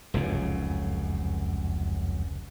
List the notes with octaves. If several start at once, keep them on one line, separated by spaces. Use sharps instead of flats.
F1 C#2 F#2 C#3